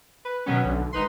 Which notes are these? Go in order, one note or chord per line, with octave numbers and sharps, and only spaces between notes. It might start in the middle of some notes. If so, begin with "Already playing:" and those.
B4
B2 D#3 F#3 B3 C#4
B1 D3
G#1 D#4 B4 C6